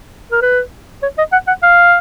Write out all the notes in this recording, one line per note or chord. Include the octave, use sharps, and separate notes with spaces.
A#4
B4
C#5
D#5
F#5
F#5
F5